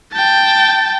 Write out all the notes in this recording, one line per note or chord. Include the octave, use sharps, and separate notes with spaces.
G5 A5